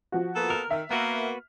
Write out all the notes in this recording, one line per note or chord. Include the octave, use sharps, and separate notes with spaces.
F3 F#4
A#3 B3 A4
A#4 F6
D#3 E5
A#3 B3 F#4 B4